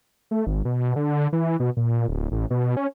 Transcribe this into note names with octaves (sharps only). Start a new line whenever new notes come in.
A3
G#1
B2
D3
E3
B2
A#2
D1
A1
B2
C#4